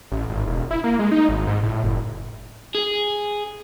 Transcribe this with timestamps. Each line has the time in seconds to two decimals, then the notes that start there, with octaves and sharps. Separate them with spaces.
0.12 A1
0.29 G#1
0.46 E1
0.71 E4
0.84 A#3
0.99 G#3
1.12 D#4
1.29 G#1
1.47 G#2
1.63 A2
1.83 F#1
2.74 G#4